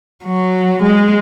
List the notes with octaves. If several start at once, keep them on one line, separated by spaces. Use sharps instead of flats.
F#3
G#3